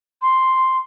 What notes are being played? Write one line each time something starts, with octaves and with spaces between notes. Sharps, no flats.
C6